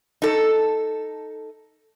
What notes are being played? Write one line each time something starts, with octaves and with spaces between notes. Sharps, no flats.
D#4 A4